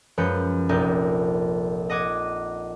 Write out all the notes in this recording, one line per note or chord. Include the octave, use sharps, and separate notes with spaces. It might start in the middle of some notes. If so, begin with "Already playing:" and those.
F#2 F3 G#3 B4 G6 C#7
F1 A#1 D#4 G6
D#5 F#5 D6 G#6